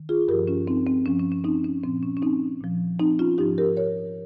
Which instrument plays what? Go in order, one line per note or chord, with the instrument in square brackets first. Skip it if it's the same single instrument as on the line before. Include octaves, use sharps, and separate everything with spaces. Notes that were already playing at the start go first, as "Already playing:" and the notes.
Already playing: [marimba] D#3
F4 G#4
G2 F3 G4 A#4
C#4 F4
C4 D#4
C4
G2 F3 C#4
C#4
C#4
C4 D#4
C#4
A#2 F3 C4
C#4
C#4
C4 D#4
A#2 F3
C4 D#4
C#4 F4
G#2 F3 D#4 G4
G4 A#4
A#4 C#5